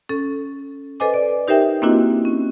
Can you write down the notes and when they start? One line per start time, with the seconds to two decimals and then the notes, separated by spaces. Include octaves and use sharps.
0.09 C#4 A4
1.00 A4 B4 C5 D#5 G#5 D6
1.14 D5
1.48 D#4 G4 A#4 C5 E5 G5
1.82 A#3 C4 D4 E4 F#4 D#5
2.25 C#4